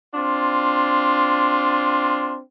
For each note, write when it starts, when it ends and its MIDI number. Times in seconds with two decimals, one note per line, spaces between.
0.14 2.38 60
0.14 2.38 62
0.14 2.38 65